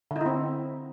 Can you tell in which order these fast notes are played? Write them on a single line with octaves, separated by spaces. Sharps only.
D3 D#4 E4 C4